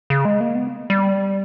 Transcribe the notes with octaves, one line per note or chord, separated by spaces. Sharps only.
C#3
G#3
A#3
B3
G3